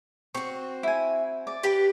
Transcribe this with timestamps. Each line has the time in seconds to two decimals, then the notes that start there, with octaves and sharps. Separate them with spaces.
0.35 C4 F#4 C#6
0.83 E4 G#5
1.47 D5
1.63 G4 B4 G5